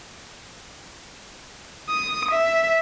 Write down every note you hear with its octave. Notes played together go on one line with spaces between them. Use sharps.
D#6
E5